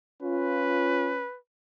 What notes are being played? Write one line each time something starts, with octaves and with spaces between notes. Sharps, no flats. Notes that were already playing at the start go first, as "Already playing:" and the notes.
C#4 F4 B4